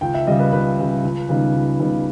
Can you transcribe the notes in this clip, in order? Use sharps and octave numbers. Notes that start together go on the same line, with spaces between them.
C#2 G5
E5
C#3 G3 D#5
B4
C#2 B4
C#3 G3
C#2
C#3 G3 B3 D#4
C#2
C#3 G3 B3 D#4